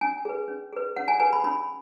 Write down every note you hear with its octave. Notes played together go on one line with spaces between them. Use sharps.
C#4 G#5
G#4 B4
C#4
G#4 B4
C#4 F#5
G#5
G#4 B4 G#5
B5
C#4 B5